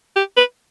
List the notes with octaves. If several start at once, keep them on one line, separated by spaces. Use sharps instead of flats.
G4
B4